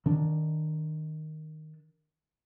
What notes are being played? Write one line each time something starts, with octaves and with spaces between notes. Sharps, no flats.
D#3 D4